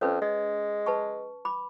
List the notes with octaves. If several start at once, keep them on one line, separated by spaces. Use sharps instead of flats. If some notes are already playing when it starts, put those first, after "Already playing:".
F2 C#4 B4 C#5
G#3 D#5
B4 A5 C#6
B5 D6